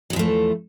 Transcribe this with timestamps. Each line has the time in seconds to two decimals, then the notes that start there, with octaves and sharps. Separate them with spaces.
0.10 F#3
0.13 E2
0.16 F3
0.19 A3